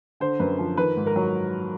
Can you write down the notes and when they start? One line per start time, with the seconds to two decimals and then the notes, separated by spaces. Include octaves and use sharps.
0.20 D3 C5
0.39 F#2 B4
0.59 F3
0.77 D#3 B4
0.96 G#2
1.06 A#4
1.16 F#3